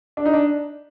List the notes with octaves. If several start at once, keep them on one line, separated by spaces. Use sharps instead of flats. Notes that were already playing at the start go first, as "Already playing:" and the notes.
D4
D#4
D4